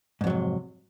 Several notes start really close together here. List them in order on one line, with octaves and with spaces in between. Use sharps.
G#2 F2 F#3 C3